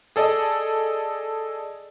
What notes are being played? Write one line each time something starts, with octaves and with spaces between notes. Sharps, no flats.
G#4 A4 D5 D#5